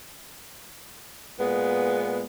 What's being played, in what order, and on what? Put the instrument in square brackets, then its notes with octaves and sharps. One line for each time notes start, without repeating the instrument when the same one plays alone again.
[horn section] A#2 G#3 B3